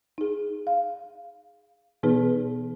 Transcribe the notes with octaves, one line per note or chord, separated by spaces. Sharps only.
D#4 G#4
F5
B2 E3 B3 D#4 G#4 B4